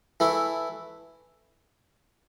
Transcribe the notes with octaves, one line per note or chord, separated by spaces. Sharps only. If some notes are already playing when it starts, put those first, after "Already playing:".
E3 A3 E4